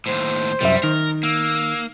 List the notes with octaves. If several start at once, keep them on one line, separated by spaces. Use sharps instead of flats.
D#2 A2 C5
C2 F#2 G3 E5
D#3 A#4
A#3 E6